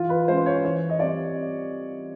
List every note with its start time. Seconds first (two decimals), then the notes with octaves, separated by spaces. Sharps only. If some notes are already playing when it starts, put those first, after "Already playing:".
Already playing: E3 F4
0.09 B4
0.28 G#3 C#4 C5
0.46 C#5
0.64 E3 C#5
0.90 D#5
0.99 G3 C4 D5